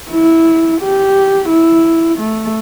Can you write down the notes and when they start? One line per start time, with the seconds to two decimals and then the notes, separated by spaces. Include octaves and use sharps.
0.11 E4
0.81 G4
1.49 E4
2.19 A3